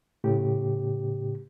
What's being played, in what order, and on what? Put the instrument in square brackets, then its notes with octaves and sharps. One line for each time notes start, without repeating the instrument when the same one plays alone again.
[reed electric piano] A2 C#3 G4